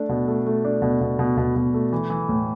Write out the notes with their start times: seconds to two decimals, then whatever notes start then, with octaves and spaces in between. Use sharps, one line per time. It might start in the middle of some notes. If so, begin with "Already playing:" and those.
Already playing: A3 D4
0.09 B2
0.28 A3
0.46 A3
0.65 D4
0.82 B2
1.01 B2
1.19 B2
1.37 B2
1.56 B2
1.74 A3
1.92 E3
2.10 E3
2.29 A2